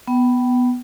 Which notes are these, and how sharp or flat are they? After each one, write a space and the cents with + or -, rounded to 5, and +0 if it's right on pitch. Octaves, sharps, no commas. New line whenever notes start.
B3 +0 G5 -30